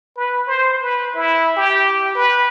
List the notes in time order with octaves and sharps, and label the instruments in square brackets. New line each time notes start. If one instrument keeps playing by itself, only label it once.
[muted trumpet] B4
C5
B4
E4
G4
B4